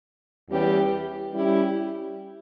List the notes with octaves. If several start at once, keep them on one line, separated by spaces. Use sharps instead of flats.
E2 E3 G3 C#4 G4
G3 C#4 E4 G4